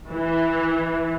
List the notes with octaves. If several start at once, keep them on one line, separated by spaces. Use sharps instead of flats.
E3